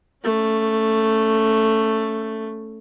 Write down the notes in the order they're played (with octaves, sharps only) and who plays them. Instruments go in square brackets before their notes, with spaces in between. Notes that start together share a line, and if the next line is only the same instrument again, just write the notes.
[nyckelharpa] A3 C#4